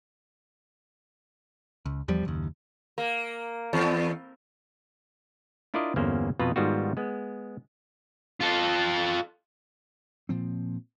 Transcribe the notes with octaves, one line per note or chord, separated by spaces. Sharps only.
C#2
E2 F3 G3
F#1 D#2
A#3
E2
D4 E4 F4 A#4 D5 D#5
G1 E2 A#3 C#4 C5
F2 B2 F4 B4 A#5
G#2 D#3 G3 B3 F4 F#4
G#3 B3
F4 A4
A#2 F3 C4